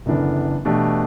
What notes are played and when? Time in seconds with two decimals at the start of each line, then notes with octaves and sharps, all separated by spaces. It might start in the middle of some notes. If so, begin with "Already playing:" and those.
0.06 F#1 F#2 D3 E3 B3 D4
0.65 B2 E3 A3 D4 G4